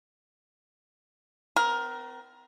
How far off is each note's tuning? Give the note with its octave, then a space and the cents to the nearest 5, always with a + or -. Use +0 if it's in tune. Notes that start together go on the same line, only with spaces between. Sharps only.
C4 -45 A#4 +15